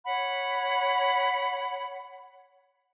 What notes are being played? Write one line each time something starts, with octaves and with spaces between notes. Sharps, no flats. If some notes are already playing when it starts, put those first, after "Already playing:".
C#5 F#5 B5